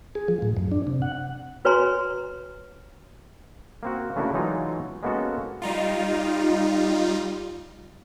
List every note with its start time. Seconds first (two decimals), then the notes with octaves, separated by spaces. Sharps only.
0.15 G#4
0.28 F3
0.42 A2
0.57 F#2
0.72 D4
0.87 C3
1.02 F#5
1.65 F#4 B4 C#5 G#5 A#5 C6
3.83 A#3 C4 F#4
4.16 C#3 A3 A#3 D4 E4 F#4
4.33 E3 F#3 G#3 D#4 F4
5.03 G#3 A#3 B3 C#4 F#4 A4
5.62 G3 D#4 F4